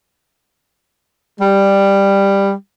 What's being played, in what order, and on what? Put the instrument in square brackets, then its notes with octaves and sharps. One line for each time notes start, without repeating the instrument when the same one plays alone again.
[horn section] G3